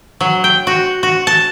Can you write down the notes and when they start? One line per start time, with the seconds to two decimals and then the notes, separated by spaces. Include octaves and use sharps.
0.21 F#3
0.44 G5
0.67 F#4
1.03 F#4
1.27 A5